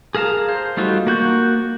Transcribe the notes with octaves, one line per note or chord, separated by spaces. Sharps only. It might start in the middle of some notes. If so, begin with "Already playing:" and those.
G#4 A#4 F5 A5 A#5
C5
G3 A3 D#4 F4 F#4
A#3 F#4 G6